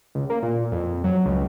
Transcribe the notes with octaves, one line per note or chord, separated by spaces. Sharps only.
C#2
A#3
A#2
F2
F#3
C#2